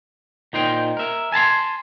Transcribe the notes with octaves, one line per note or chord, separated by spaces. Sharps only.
A#2 D#4 C5 G5
A#4 E5
G#5 A5 B5 C6